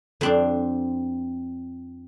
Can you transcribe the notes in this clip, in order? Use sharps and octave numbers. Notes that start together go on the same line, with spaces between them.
F2 C4 D4